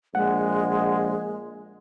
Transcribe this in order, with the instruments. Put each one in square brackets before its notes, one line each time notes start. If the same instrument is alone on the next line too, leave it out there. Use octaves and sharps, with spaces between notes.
[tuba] A#1 [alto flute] G#3 [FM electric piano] F#5